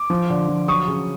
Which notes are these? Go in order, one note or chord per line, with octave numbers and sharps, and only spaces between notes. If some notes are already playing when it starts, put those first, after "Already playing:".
Already playing: D6
F3
D3
F3
F#3 C#6 D#6
C#3